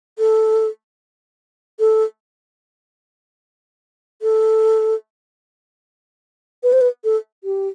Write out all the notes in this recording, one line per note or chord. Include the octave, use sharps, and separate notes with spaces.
A4
A4
A4
B4
C5
B4
A4
G4